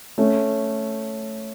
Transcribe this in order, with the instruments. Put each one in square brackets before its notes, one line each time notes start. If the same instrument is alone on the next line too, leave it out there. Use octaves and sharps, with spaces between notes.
[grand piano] A3 C#4